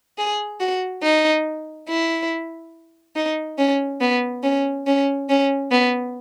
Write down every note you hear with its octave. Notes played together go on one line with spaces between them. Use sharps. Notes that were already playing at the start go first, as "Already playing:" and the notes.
G#4
F#4
D#4
E4
D#4
C#4
B3
C#4
C#4
C#4
B3